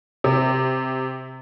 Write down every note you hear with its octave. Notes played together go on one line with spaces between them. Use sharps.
C3